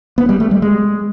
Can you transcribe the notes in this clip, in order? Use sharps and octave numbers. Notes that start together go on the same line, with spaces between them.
B3
G3
A3
G3
G#3